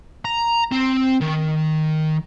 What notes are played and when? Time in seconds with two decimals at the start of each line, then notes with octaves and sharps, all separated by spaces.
0.25 A#5
0.72 C4
1.21 D#3